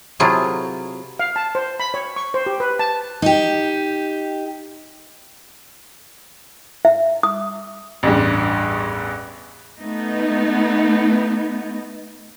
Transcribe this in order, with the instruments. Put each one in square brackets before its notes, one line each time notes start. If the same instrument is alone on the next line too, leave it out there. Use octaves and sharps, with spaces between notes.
[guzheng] C3 F#3 E4 F4 G#4 A4
[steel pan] F5
A5
C5
B5
C#5
C#6
C5
G4
B4
A5
[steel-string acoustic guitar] D#4 G4
[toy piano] E5
D#6
[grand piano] A1 E2 G2
[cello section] A3 B3 D#4